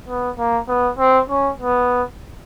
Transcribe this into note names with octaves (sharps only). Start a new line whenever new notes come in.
B3
A#3
B3
C4
C#4
B3